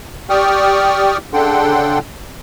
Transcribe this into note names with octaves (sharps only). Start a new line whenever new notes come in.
G4 D5 G5 C#6 D#6 F6
C#3 D4 A4 F#5 G5 C6